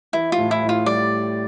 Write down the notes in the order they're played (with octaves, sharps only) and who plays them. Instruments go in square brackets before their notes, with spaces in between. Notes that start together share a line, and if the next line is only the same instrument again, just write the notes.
[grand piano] E3 [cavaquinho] E4
[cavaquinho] F4
[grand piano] A2
[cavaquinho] E4
[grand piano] A2
[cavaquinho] F4
[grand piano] G3 [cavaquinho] D5